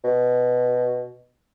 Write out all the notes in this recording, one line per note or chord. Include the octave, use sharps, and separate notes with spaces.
B2